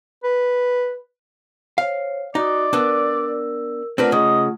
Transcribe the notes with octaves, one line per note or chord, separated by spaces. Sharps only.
B4
C5 C#5 F5
D#4 F#4 D5 D#6
B3 D4 A#4 E6
A3 C4 D4 F4 A#4 B4 F#5
C#3 D#5